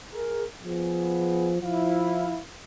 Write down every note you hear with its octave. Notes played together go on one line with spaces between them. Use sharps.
G#4 A#4
F3 B3 G#4
F3 E4 F5